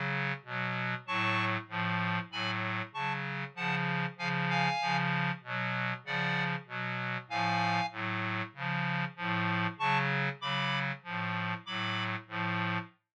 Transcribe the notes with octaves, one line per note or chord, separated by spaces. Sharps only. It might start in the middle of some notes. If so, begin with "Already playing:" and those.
Already playing: C#3 F#3
B2 F#3
A2 F#3 A5 C#6
A2 F3
A2 F#3 G#5 B5
C#3 F#3 A5 C#6
C#3 F3 F#5 A5
C#3 F3 F5 G#5
F5 G#5
C#3 F3
B2 F#3
C#3 F3 D5 F#5
B2 F#3
A2 F3 F5 G#5
A2 F#3
C#3 F3
A2 F3
C#3 F#3 A5 C#6
C#3 F#3 B5 D6
A2 F3
A2 F#3 B5 D6
A2 F3